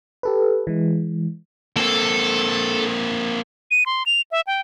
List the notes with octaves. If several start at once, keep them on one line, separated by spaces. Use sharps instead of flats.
G4 A4 B4
E3 G#3
A#3 C4 A4
D#7
C6
F7
E5
G5